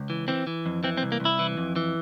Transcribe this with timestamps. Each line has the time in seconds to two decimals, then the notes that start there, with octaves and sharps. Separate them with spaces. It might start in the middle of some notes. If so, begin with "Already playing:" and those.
Already playing: C#2
0.10 E3
0.28 E3 C4
0.47 E3
0.66 F2
0.84 E3 C4
0.97 C4
1.03 C2
1.12 A#3
1.20 C2
1.25 E4
1.39 E3
1.58 F2
1.76 E3